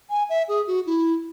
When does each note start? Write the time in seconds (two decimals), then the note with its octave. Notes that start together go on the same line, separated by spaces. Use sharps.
0.10 G#5
0.29 E5
0.48 G#4
0.67 F#4
0.86 E4